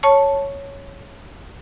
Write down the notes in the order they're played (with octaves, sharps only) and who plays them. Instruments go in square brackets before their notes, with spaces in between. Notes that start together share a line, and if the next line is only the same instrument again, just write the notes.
[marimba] C#5 A5 C#6